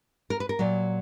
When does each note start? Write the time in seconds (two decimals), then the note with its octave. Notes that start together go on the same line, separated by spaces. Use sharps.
0.30 A#4
0.40 B4
0.49 A#4
0.59 A#2 F#3